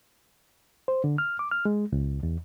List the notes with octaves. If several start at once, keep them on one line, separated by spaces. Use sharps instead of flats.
C5
D3
F6
D6
F6
G#3
C#2
E2